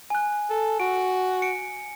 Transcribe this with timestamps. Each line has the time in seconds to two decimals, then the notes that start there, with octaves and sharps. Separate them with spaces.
0.10 G#5 F#6
0.50 A4
0.80 F#4 D7
1.42 C#7 D7